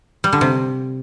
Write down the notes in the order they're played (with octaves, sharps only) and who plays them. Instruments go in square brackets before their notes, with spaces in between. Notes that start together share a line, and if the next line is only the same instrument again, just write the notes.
[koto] G3
D3
C3